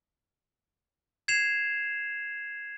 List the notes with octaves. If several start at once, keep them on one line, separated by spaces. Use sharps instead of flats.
G#6 C7 E7 F7